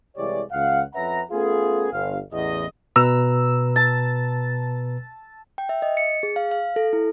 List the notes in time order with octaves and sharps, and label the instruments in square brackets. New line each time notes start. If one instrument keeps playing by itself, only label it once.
[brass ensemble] C2 E3 G#3 G4 C#5 D5
C#2 F5 F#5
F2 C#4 B4 E5 F#5 A#5
A3 B3 C#4 F4 G#4
G1 F5
A1 E2 D#5
[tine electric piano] B2 B4 A#5 [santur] E6
[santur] A5
[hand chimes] G5
E5
D#5
C#7
G#4
F5
F5
A4
E4